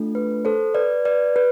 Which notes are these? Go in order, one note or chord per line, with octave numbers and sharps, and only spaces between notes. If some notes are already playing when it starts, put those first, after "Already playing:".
Already playing: A3 D4 F4 A4
B4
A4 C5
B4 D5
B4 D5
B4